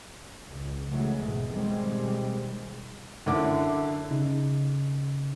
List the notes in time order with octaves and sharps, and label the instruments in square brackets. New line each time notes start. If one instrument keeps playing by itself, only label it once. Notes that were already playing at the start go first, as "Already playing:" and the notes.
[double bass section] C#2
C#3 E3 F#3 G#3 A3
G#1 E2 B2
B2 D#3 G3 G#3 C4
[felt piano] F#2 D3 D4 E4 D6
[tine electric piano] C#3 D#4